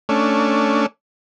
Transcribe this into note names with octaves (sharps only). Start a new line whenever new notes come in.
A3 C#4 D4